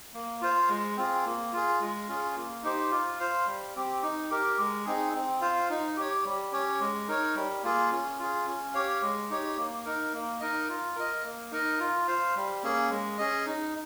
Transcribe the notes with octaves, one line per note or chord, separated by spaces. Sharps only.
A#3
F4 C5 F5
G#3
C4 F4 G#4
A#3
F4 G#4
G#3
C#4 F4 G#4
A#3
D#4 G4 C5
F4
C5 F5
G3
C4 G4
D#4
G4 A#4
G#3
C4 D#4 G#4
C4
F4 C5 F5
D#4
G4 C#5
G3
C#4 G4 C#5
G#3
D#4 A#4 C#5
G3
A#3 F4 G#4
C#4
F4 G#4
C#4
G4 C#5 F5
G#3
D#4 G4 C#5
A#3
D#4 A#4
A#3
D#4 A#4 D#5
F4
A#4 D#5
A#3
D#4 A#4 D#5
F4
C5 F5
G3
A#3 C#4 G#4
G#3
C#4 G#4 D#5
D#4